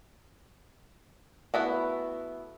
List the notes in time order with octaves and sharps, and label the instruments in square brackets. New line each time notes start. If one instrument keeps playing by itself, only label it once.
[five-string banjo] A3 B3 E4 F#4